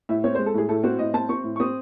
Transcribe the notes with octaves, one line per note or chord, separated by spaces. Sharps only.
A2 E5
C4 C#5
G#3 C5
A4
A2 G#4
A2 A4
C4 F#4
A2 D#5
C4 A5
C4 C#6
A2
C#6
C4 D#6